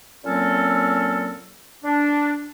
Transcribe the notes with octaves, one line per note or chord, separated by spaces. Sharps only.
A#2 F#3 A#3 C4 C#4 A4
D4